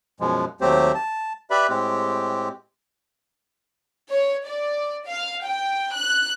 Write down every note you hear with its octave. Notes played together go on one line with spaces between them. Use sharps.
F#2 B2 F3 G#3
D#2 F#3 A3 C4 G4 C5
A5
G4 B4 D5 E5 B5
A2 G#3 C4 G4
C#5
D5
F5
G5
F#6